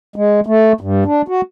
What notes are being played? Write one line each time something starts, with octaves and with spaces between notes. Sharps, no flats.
G#3
A3
G2
D4
F#4